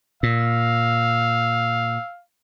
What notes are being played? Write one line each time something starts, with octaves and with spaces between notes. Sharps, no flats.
A#2 F5 E6